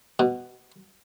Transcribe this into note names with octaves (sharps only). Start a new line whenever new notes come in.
B2